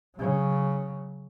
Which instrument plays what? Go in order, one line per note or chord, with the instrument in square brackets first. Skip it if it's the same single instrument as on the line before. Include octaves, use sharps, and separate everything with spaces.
[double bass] C#3 F#3